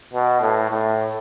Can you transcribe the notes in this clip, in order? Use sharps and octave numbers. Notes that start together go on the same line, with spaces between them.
B2
A2
A2